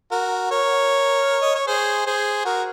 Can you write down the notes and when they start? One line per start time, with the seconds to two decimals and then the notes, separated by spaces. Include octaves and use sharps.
0.11 F#4 A#4
0.50 A#4 C#5
1.42 D#5
1.55 C#5
1.67 G#4 C5
2.06 G#4 C5
2.45 F#4 A#4